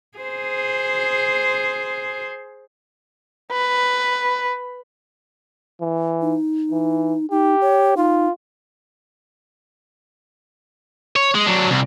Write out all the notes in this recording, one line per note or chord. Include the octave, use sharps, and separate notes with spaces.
G#4 C5
B4
E3
D#4
E3
D#4 G4
C#5
D#4 F4
C#5
G#3
F#3 D4
C2